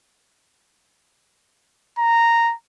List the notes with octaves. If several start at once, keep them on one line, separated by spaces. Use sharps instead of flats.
A#5